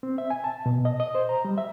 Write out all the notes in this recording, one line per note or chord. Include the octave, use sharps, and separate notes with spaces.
C4
E5
G#5
A5
B2
D#5
D#5
C5
A#5
G3
E5